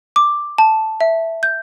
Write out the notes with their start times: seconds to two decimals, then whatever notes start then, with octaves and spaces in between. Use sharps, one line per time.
0.16 D6
0.58 A5
1.01 E5
1.43 G6